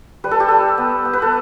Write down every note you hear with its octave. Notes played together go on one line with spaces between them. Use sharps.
G3 B4
A4
G4
G3 A4
B3
B3
B4
A4